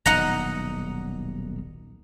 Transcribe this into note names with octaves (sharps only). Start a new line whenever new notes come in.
D#1 B1 D#4 F#5 A#5